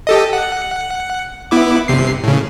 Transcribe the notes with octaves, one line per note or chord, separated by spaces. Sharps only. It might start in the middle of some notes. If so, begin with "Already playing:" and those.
G4 A4 D#5
F#5
B3 E4 D6
G1 C3 C7
A2 C#3